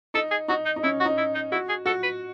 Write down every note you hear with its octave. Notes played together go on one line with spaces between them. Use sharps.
D#4 A4
G#4
D#4 F#4
D#4
D#4
C#4 E4
F#4
D#4
E4
D#4
E4 F#4
G#4
F#4 A4
B4